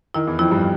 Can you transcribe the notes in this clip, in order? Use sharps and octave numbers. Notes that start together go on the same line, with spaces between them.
D#3 E4
E2 E3
F2 F3 E4
G2 G3